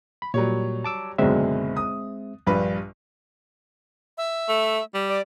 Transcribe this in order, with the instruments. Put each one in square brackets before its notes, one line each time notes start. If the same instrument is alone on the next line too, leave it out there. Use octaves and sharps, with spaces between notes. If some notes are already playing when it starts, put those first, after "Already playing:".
[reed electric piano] B5
[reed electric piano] A#2 [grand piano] F#3 G3 C#5
[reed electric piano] A5 D6 E6
[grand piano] F#1 B2 D3 [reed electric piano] G#3 C4 E5
[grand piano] D#6
A#1 G2 B4
[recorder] E5
[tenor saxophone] A3
G3
[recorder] D5